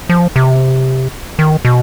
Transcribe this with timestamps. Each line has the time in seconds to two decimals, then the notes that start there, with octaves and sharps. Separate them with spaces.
0.09 F3
0.36 C3
1.39 D#3
1.65 B2